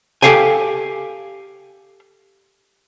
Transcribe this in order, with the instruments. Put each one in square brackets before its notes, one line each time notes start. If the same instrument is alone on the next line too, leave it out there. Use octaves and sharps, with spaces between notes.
[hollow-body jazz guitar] G4 A4 F5 G5 G#5